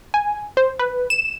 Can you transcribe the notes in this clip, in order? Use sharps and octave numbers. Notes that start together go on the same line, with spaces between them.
G#5
C5
B4
E7